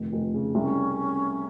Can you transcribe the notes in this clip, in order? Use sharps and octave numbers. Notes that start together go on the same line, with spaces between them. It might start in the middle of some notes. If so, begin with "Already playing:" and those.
Already playing: F1 D#3
F1
C#3
C2 C#4